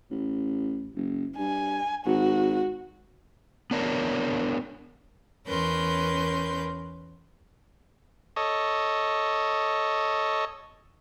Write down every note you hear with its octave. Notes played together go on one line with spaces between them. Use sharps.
A1
F#1
G2 G#5
G#1 F#4
B3 D4 A#4 C#5
E2 C#4 A#4 B4 C6 G6
A4 C#5 D#5